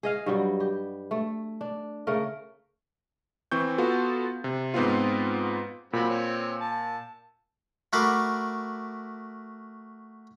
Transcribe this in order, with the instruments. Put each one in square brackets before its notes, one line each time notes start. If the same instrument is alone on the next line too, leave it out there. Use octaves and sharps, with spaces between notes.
[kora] G#4 D#5 F5
G2 F#3 G3
G4
A3
D4
C#3 A3 A#4
[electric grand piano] E3 C4 C#6 G6
B3 F4 F#4 A4
C3
G#2 B3 C4 F4
[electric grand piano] A#2 [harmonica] F#3 C4 B5
[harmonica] C4 C#5
A5
[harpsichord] A3 F#4 A#4 B5 C6 D6